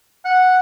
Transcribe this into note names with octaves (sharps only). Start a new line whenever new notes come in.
F#5